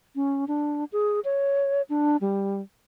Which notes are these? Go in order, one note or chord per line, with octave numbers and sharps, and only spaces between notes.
C#4
D4
G#4
C#5
D4
G3